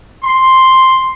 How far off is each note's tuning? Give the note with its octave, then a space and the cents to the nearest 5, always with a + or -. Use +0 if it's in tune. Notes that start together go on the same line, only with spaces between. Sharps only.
C6 +5